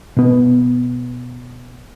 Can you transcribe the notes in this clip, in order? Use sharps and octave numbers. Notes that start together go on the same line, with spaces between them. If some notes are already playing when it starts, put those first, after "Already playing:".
B2 B3